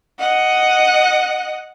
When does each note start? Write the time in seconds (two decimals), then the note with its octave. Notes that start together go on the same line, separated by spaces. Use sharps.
0.19 D#5 F#5